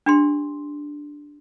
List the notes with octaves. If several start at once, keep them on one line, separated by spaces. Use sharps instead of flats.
D4 G4 C6